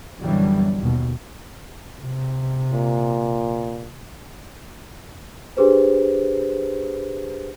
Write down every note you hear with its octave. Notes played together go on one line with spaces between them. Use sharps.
F#2 B2 D3 E3 F#3 G3
D#2 B2
C3
A#2
D4 G4 G#4 B4 C5